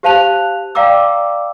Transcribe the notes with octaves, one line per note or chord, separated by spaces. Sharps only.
G4 C5 F5 A5 F#6 F7
D5 F5 G5 A#5 D6 E6